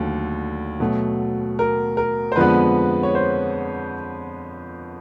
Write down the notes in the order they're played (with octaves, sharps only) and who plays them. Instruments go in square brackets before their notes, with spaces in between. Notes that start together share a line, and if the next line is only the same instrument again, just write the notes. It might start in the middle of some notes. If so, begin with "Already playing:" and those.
Already playing: [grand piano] D#2 D3 F#3 A3
B2 F#3 A3
A#4
A#4
C5
F2 D3 F3 G#3 B3 B4
C#5
C5